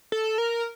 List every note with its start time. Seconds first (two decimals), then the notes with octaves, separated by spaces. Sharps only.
0.12 A4
0.38 A#4